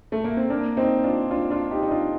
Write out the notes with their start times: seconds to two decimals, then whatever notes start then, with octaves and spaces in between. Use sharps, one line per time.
0.12 A3
0.24 A#3
0.37 C4
0.50 A#3 D4
0.77 C4 D#4
1.04 D4 F4
1.31 D4 F4
1.50 D4 F4
1.71 D#4 G4
1.83 D#4
1.91 D4 F4